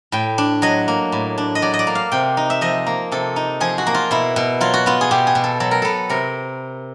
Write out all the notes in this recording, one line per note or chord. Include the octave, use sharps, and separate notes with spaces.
A2 G5
D4
F#3 D#5
A#3
A2
D4
D#5
F#3 D5
D#5
D5
A#3
F5
C3 G5
D#4
E5
F3 D#5
A#3
C3 A4
D#4
F3 G#4
F#4
A#3
F4
B2 E4
B2
F#3 F4
F#4
B3 F4
G#4
B2 G4
G#4
B2
A4
F#3 A4
A#4
B3 A4
C3 A#4